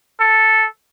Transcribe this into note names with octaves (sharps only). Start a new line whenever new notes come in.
A4